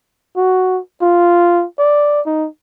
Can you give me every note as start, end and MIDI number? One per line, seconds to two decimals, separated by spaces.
0.36 0.80 66
1.02 1.65 65
1.79 2.21 74
2.26 2.48 63